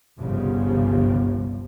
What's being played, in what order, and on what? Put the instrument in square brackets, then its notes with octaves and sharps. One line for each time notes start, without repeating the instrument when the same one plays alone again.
[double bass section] G1 C2 C#3 F3 G3